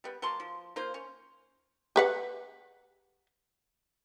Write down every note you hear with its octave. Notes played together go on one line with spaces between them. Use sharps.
G3 B3
F#3 A#3 A5 C6
F3
A#3 F4 C5
C#4
G4 B4 F#5